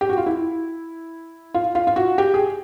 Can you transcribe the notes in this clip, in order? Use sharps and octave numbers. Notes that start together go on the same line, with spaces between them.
G4
F#4
F4
E4
F4
F4
F4
F#4
G4
G#4